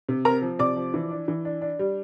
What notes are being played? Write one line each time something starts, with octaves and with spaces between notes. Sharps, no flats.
C3
C4 A#4 A#5
F3
C3 D5 D6
F3
E3
D4
E3
D4
D4
G3